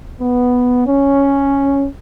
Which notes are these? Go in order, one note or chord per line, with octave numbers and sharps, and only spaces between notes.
B3
C#4